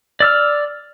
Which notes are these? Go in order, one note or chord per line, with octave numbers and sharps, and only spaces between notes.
D5 E6 F6